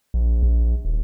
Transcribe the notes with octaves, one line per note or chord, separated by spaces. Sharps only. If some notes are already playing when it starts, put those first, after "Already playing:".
A#1
A#1
D#1